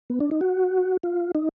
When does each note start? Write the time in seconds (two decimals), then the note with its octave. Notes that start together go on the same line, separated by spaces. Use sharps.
0.10 B3
0.20 D4
0.31 D#4
0.41 F#4
1.03 F4
1.35 D#4